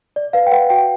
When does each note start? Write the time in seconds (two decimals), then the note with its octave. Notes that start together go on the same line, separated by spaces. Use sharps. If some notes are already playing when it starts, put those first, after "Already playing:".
0.16 D5
0.33 B4 F5
0.47 G5
0.51 B4 F#5
0.70 F#4 G5